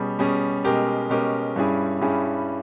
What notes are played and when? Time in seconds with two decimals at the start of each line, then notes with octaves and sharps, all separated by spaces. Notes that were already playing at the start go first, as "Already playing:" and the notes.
Already playing: B2 G3 C#4 G#4
0.19 B2 G3 C#4 G#4
0.64 B2 G#3 C#4 G4 A#4
1.10 B2 G#3 C#4 G4 A#4
1.56 G2 G3 C#4 E4 G#4
2.01 G2 G3 C#4 E4 G#4